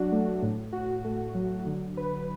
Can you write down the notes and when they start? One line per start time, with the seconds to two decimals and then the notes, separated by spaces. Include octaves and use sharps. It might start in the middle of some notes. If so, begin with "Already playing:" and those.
Already playing: F#3 D4 F#4
0.12 A3
0.43 A2
0.73 F#4
1.04 A3
1.35 F#3
1.66 D3
1.97 B4